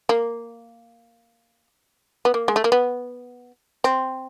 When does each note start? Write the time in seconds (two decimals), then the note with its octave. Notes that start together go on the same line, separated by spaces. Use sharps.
0.09 A#3
2.25 B3
2.34 A#3
2.48 G#3
2.56 A3
2.64 A#3
2.72 B3
3.84 C4